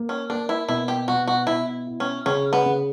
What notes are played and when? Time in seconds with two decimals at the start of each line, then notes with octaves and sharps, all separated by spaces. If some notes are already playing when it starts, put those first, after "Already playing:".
Already playing: A#3
0.09 C#4
0.30 A#3 D4
0.49 E4
0.68 B2 E4
0.88 G4
1.08 B2 F#4
1.27 F#4
1.47 B2 E4
1.87 E4
2.00 C#4
2.26 C#3 C#4
2.53 B3
2.66 C#3